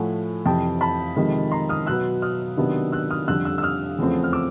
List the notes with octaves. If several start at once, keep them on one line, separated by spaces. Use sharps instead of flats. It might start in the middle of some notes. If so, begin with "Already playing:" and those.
Already playing: A2 F3 A3 F#5 G#5
F2 C3 E3 G5 A5
A5 B5
F2 C3 D#3 G#3
A#5 C6
D#6 F6
B2 F#3 B3 E6 F#6
D#6 F6
C3 D#3 F#3 B3 D4
E6 F#6
D#6 F6
F2 D3 G3 E6 F#6
E6 F#6
E6
D#6 F6
E2 C#3 F3 A3 C4
F6
D6 E6